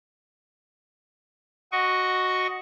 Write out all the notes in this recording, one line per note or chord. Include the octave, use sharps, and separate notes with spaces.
F#4 D#5 C#6